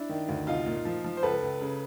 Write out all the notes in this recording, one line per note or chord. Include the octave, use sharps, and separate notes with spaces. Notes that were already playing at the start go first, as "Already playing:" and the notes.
Already playing: D4 E4
D#3
D2
C2 D#4 F4
A#2
F3
F3
C5
C#2 A4 B4
C#2
C#3